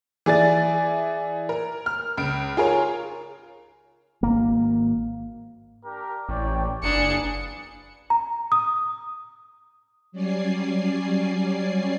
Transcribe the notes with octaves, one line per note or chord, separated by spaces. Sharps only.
E3 G#4 D5 A6
A#4
F6
C#2 D7
F4 G#4 A#4 C#5
G#1 A#3
D4 G4 A#4
A1 C#5 D5 G5
F#1 A#3 B3 D4 G#4 C#7
A#5
D#6
F#3 G3 C#4 D5 G#5 C7